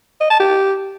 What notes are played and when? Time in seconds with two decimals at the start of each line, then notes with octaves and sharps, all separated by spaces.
0.21 D#5
0.30 A5
0.40 G4